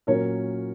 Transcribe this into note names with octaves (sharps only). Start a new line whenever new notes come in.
A#2 F#3 C#4 A#4 C#5